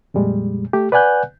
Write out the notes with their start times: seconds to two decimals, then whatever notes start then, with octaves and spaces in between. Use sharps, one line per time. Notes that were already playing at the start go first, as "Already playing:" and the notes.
0.14 F2 A#2 G3 G#3
0.73 A3 G4
0.92 B4 D5 F#5 G#5 F#6 G6